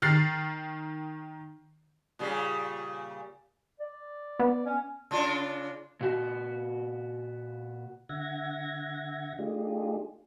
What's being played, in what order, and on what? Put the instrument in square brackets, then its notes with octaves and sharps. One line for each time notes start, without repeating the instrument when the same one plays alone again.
[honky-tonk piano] D#3 F6 A6 C7
[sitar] A#2 C#3 G3
[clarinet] D5
[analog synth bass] B3
[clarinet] C#4
[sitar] C#3 D4 F4
[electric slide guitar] A#2 F#4
[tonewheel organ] D3 E5 F#5 G#6 A#6
A3 D4 D#4 F4 G4 G#4